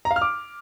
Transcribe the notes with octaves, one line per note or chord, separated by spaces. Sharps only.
A#5
F5
F6
D6